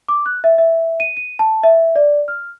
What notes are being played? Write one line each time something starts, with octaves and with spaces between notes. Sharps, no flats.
D6
F#6
E5
E5
D#7
D#7
A5
E5
D5
F6